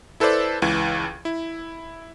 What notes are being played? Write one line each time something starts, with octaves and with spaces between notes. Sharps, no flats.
E4 A4 B4 C5 D5
C#2 E3 G#6
E4